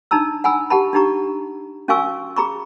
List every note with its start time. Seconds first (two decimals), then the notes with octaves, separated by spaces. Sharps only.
0.11 D4 D#4 A5 A#5 E6
0.44 F#5 G#5 B5 E6
0.70 G4 F#5 A5 B5
0.93 D4 D#4 G4 A#5 C#6
1.88 C#4 F#4 F5 G#5 C#6 E6
2.37 G#4 A#5 B5 C#6